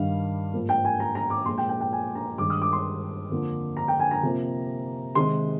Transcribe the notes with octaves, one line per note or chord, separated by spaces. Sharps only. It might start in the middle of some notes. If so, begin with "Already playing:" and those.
Already playing: G2 D#3 G3 F5
G#2 F3 A#3
G5
G#5
A#5
A#5
D6
A#2 F3 G#3 C6
G5
G5
G5
G#5
A#5
G2 D#3 G#3 D6
D#6
D6
C6
F2 D3 F3 A#3
A#5
G5
G#5
A#5
C3 F3 A#3
C3 D#3 G#3 C6